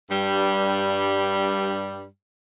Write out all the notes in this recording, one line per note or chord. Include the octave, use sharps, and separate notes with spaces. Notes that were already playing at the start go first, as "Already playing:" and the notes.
G2 G3